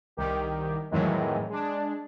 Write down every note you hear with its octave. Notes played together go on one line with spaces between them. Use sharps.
C2 D#3 G4
F2 A2 D#3 E3 F#3 G#3
G#3 D4